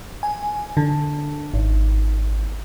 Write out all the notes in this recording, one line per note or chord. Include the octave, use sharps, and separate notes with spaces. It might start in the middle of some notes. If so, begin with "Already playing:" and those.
G#5
D3
G#1